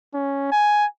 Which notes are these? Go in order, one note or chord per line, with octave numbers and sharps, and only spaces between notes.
C#4
G#5